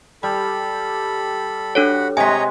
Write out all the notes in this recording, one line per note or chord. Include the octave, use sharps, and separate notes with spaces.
G3 A4 B5
D4 F#4 A4 C#5 F#5 B5
C3 G#3 C#5 D#5 G#5 A#5 B6